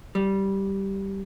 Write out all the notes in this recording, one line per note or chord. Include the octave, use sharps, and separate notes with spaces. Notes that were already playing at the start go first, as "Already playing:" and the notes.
G3